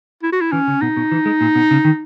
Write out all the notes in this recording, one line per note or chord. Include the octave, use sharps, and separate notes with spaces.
E4
F#4
E4
E3 C#4
C#3
B2 D#4
B2
E3
G#3
A#2
B2
C#3
D#3